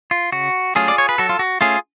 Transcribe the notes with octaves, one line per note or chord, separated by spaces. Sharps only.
F4
C#3 F#4
F#3 A3 C#4 F4 G#4
D5
C#5
B4
F#3 F#4 A4
F4
F#4
A3 C#4 F4 G#4